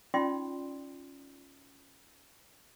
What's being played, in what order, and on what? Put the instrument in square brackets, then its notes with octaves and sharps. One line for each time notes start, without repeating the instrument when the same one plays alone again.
[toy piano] C#4 D#4 F4 D5 G5 C6